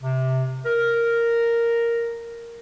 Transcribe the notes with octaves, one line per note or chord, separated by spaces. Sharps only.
C3
A#4